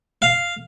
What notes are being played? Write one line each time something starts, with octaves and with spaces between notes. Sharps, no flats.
F5